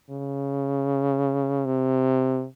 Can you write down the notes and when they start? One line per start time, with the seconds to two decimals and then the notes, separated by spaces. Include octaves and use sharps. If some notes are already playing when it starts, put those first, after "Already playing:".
0.10 C#3
1.66 C3